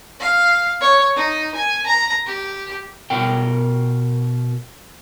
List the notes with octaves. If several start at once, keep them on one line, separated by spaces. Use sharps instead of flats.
F5
C#5
D#4
G#5
A#5
G4
B2 A#4 G5